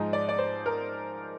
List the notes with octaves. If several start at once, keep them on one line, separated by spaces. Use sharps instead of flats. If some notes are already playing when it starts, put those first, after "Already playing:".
Already playing: G#2 F3 G#3 D#4
D5
D5
C5
A#4